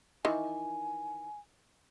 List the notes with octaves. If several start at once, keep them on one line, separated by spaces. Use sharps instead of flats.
D#3 E3 G#5